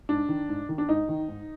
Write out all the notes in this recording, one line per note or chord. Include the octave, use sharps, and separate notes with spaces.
G#2 D4
D#3
G#2
D#3
D4
G#2 D#4
D#3
G#2